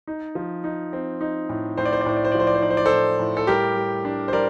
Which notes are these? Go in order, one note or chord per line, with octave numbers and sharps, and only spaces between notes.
D#4
F3
D#4
C4
D#4
A2
A2 C5
D5
C5
D5
A2 C5
D5
C5
D5
F3
C5
D5
C5
D#4 D5
C5
D5
A4 C5
A2
A2
A4
G3 G4 A#4
G3
D4
C5
G3 A#4 D5